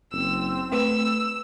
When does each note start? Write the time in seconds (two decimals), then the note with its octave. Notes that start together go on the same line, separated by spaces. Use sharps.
0.12 F#1 C4 E6
0.72 A3 B4 E6